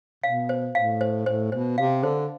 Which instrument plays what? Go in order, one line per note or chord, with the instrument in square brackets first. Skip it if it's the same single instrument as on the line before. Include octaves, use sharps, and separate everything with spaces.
[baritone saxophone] B2 [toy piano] F5
[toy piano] C5
[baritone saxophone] A2 [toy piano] F5
[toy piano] C5
[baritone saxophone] A2 [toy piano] C5
[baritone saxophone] B2 [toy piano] C5
[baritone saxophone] C3 [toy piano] F5
[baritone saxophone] D3 [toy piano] C5